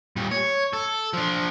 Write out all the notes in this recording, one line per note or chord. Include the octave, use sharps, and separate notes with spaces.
A#2 G3
C#5
A4
F3 D4